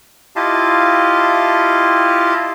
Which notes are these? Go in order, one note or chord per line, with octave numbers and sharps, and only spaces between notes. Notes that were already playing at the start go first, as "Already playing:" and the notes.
E4 F4 G4 D#5 F5 A5